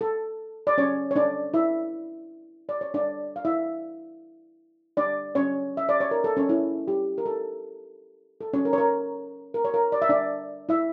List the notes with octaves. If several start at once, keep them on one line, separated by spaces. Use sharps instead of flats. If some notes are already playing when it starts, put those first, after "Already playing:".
A4
D5
C#4 C#5
C#5
D4 D5
E4 E5
D5
C#5
D4 D5
F5
E4 E5
D4 D5
C#4 C#5
E5
D5
C#5
A#4
A4
C#4 C#5
E4
G4
A#4
A4
A4
C#4 C#5
A#4
C#5
A#4
A#4
C#5
A#4
D5
E5
D4 D5
E4 E5